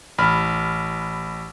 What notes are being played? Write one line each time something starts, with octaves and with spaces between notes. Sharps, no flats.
A1 B5 F6